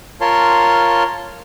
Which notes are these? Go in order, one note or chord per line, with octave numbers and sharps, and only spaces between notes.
F4 A#4 C#5 A5 C6